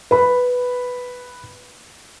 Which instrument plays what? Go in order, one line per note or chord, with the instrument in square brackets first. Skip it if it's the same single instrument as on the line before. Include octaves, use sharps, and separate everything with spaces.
[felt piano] B4 B5